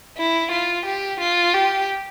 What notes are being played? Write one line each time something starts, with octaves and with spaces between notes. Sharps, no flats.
E4
F4
G4
F4
G4